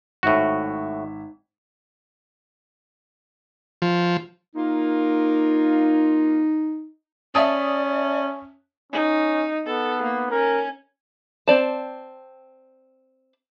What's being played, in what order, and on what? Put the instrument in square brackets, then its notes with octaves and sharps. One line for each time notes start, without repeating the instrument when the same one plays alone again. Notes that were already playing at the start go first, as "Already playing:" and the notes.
[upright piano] G#1 E5 [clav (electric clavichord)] A2 F#4
[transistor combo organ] F3
[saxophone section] A#3 F4 [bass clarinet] D#4
[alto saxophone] C#4 [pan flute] D5 [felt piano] E5 A5 D#6
[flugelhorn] C#4 [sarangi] D#4
[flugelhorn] B3 [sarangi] A4
[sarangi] A#3
[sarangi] C#4 [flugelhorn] A#4
[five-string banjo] C4 D5 A5